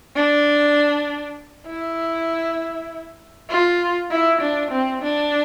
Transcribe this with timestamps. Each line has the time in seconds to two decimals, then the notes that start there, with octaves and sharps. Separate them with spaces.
0.16 D4
1.67 E4
3.50 F4
4.11 E4
4.41 D4
4.71 C4
5.02 D4